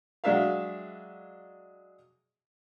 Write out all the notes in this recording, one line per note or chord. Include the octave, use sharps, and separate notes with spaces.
F#3 G#3 D4 E5 F5